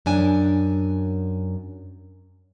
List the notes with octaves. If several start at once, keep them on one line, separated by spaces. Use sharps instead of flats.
F#2 D4 G#5